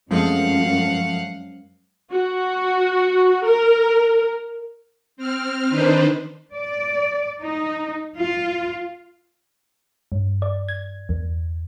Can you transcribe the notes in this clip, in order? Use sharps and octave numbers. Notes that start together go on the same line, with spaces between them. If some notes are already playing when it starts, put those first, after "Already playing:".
F#2 F3 G#3 A3 C4 D#5 F5 F#5
F#4
A#4
C4 F6
D#3 D4 D#4 B4 C5
D5
D#4
F4
G2
D5
G#6
E2